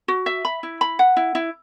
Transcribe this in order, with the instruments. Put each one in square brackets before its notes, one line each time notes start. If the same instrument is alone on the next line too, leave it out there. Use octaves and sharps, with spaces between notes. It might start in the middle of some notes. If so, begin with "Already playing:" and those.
[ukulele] F#4
E5
B5
E4
B5
F#5
E4
E4